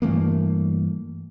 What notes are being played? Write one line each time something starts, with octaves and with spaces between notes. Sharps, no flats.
G2 E3 A3 A#3